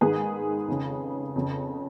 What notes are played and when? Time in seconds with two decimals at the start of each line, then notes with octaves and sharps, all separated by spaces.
0.01 G#2 D#3 G#4 B4
0.68 F2 C#3
1.35 F2 C#3